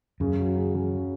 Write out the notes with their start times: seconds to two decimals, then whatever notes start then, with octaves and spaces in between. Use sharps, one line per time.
0.20 F#2 C#3
0.39 F#3
0.57 C#3
0.75 C#3